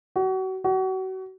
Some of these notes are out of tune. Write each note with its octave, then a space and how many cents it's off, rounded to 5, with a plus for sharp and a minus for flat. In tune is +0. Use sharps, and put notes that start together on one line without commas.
F#4 +30
F#4 +30